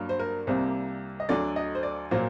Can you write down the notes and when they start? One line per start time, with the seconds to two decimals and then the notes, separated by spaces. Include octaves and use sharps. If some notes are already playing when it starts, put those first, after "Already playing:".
Already playing: G2 F#3 A#3
0.09 C5
0.19 A#4
0.47 C2 C3 G3 A#3 C5
1.20 D#5
1.29 D2 D3 F#3 D5
1.56 D#5
1.75 C5
1.83 D5
2.11 A#2 F#3 A#3 C5